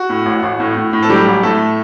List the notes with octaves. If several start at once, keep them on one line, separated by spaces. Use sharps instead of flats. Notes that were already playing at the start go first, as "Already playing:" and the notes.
Already playing: F#4
A2
A1
A1
A2
A2
A2
A4
F#3 G3 G4
A1
A2 A3 A4